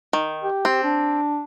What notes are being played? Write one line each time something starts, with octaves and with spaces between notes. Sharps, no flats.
D#3
G4
C4
D4